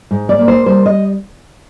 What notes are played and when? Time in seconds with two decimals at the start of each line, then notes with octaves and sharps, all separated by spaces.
0.11 G#2
0.29 D5
0.39 A#3
0.48 C5
0.66 G3 C5
0.86 D#5